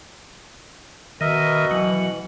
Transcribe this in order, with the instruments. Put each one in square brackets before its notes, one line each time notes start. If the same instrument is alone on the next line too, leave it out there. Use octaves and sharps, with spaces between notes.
[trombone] B2 [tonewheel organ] D#3 [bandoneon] A#4 D#5 E5
[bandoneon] E3 [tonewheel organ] F#3